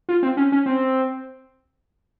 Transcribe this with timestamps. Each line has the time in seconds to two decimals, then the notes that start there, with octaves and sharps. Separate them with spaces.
0.09 F4
0.23 C4
0.37 C#4
0.52 C#4
0.66 C4